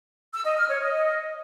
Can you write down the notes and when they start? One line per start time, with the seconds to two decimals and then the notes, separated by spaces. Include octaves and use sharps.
0.34 E6
0.46 D#5
0.58 F6
0.70 C#5
0.81 D#5